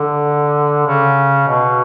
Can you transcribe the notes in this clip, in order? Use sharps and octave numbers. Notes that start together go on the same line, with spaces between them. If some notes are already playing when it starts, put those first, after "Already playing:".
Already playing: D3
C#3
B2